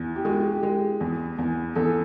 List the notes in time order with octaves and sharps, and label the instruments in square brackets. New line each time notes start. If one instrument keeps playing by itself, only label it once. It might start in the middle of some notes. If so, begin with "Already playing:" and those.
Already playing: [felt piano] E2 [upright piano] E4
[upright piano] G4
[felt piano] G#3 [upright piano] F#4
[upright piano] G4
[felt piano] G#3
E2
E2
[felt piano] E2 [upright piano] A4